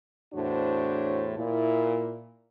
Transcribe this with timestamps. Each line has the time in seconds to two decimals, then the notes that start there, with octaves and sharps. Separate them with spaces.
0.34 E2 A2 D4 F#4 C5 C#5
1.38 A#2 E4